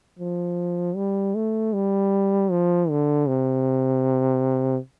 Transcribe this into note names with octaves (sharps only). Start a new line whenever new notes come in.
F3
G3
A3
G3
F3
D3
C3